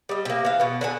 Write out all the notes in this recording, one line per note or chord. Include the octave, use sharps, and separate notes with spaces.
G3 D#5
C3 A#3
E3 F5
B2 B3
D3 F#5 G#5